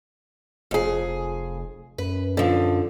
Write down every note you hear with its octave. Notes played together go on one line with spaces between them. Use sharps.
F1 F2 G#4
F#2 B4
D3 F3